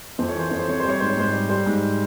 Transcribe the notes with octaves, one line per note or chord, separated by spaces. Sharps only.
F2 C5
C#5
E3 C5
F2 C#5
C5
C3 C#5
G3 C5
C#5
G#2 C5
C#5
G#2 C5
G3
G3 C5
G#2